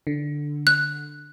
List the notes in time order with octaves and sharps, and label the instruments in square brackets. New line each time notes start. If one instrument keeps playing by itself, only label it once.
[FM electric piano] D3
[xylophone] F#6